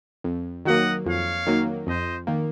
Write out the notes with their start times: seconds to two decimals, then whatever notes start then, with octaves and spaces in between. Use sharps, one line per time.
0.24 F2
0.65 D#3 F#3 A#3 D#5 F#5
1.05 F2 C#5 F5
1.47 D#3 F#3 A#3
1.87 F2 C5 D#5
2.27 D#3 A#3